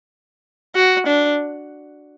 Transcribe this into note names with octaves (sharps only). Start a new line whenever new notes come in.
F#4
D4